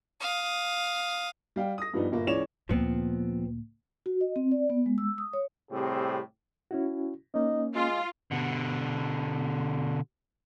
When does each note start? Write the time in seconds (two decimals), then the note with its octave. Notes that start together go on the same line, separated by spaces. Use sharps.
0.20 F5 D#6
1.56 G3 F5 G5
1.78 D#6 A#6
1.93 G2 F3 G3 B3 D#4
2.12 G1 A#2 A#3
2.27 C#2 E3 C#5 D5 E7 F7
2.69 D2 A#2 F3 B3 C4
4.06 F#4
4.21 D#5
4.36 C4
4.52 D5
4.70 B3
4.86 G#3
4.98 E6
5.18 D#6
5.33 C#5
5.71 A2 C3 G3 C4 G4 G#4
6.71 C#4 E4 F#4
7.34 A#3 C#4 D#4
7.75 G#3 F4
8.32 B2 D3